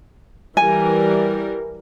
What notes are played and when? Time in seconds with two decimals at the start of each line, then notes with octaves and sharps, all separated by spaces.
0.57 E3 G3 A#4 G#5